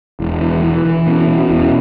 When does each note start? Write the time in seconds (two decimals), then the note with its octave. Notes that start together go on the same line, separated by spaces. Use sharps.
0.20 E1 E4
0.41 E3
0.63 E3 E4
0.85 E3
1.07 B2 C#4
1.20 E4
1.29 B2
1.34 C#4
1.48 E1 E4
1.61 C#4